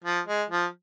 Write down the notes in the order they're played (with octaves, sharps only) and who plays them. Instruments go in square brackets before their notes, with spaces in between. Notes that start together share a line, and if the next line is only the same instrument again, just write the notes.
[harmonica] F3
G#3
F3